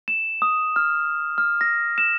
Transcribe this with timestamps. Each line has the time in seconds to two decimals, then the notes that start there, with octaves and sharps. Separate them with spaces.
0.08 E7
0.42 D#6
0.76 F6
1.38 F6
1.61 A#6
1.98 E7